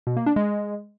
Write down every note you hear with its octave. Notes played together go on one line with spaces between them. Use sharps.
B2
A#3
D4
G#3